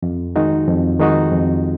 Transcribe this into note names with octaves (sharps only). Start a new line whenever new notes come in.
F2
D#3 G#3 D#4 F#4
F2
D#3 G#3 D#4 F#4
F2